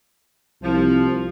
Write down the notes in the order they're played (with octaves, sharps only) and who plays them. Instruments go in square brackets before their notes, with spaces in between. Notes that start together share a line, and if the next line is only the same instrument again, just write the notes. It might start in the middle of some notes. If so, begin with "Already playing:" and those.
[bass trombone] C2 [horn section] F3